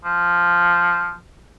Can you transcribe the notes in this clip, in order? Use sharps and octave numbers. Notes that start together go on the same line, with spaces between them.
F3